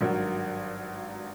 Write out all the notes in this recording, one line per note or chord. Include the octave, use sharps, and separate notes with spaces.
G#1 G2 F#3 A#4